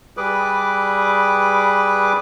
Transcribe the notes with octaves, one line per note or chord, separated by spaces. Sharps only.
G3 G#4 B4 D6